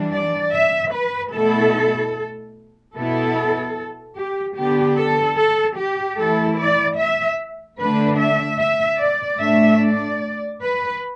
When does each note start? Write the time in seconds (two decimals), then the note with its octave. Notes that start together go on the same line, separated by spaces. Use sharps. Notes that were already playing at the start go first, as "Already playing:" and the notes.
Already playing: E3 G3 D4
0.13 D5
0.54 E5
0.94 B4
1.33 B2 A3 E4 A4
2.95 B2 B3 E4 A4
4.17 G4
4.56 D3 B3 D4 G4
4.97 A4
5.37 A4
5.77 G4
6.18 E3 A3 E4 A4
6.58 D5
6.98 E5
7.79 D3 A3 D4 B4
8.19 E5
8.59 E5
9.00 D5
9.40 A2 A3 D4 E5
9.80 D5
10.61 B4